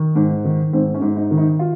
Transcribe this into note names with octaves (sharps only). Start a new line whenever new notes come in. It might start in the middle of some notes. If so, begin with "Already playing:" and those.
Already playing: D#3
G#2
D#3
G#2 C4
C#4
G#2
D#4
D#3
D#4
F4